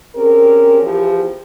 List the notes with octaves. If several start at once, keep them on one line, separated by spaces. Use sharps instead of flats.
C4 C#4 G4 G#4 A#4
E2 E3 F3 G4